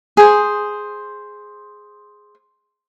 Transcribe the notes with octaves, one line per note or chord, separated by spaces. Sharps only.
G#4 C5